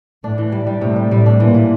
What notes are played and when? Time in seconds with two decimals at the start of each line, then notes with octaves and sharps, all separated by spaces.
0.24 A2 D4
0.38 E3
0.52 G3
0.67 G3
0.81 A2 C3
0.96 G3
1.11 A2 G3
1.26 D4
1.40 A#2 E3
1.54 E3